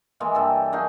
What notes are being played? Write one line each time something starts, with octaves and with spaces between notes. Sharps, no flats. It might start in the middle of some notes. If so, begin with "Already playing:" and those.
E3 G#3 A#3
G2 G4 A4
F#3 A#3 D#4 G#4